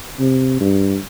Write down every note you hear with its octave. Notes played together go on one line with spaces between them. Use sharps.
C3
G2